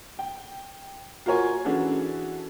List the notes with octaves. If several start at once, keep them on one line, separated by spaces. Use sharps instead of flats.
G5
F4 F#4 A#4 C#5 G#5
E3 C#4 D4 F#4 G#4 A4